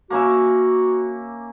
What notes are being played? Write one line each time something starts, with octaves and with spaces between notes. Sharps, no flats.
A#3 C#4 F#4 E5